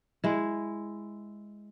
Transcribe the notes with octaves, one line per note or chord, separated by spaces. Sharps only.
G#3 E4